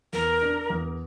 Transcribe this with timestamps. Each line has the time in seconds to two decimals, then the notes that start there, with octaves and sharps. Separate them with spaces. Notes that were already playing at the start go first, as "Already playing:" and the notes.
0.13 E2 A#4
0.42 D4
0.70 E2